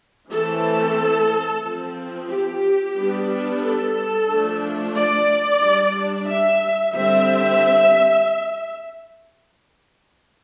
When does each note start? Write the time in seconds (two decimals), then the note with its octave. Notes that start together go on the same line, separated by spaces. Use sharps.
0.31 E3 A3 C4 A4
1.64 F3 C4
2.29 G4
2.96 G3 B3 D4
3.63 A4
4.28 F3 A3 D4
4.95 D5
5.61 G3 D4
6.27 E5
6.93 D3 G3 C4 E5